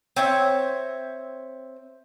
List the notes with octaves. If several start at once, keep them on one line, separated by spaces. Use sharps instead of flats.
C4 C#5 E5